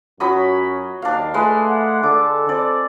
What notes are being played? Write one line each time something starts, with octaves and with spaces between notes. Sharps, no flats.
F#2 F#3 C#4 B5 D#6
D#2 A#3 D4 F5
G#3 A3 B4
F#5
D3 A4 D6
C4 D5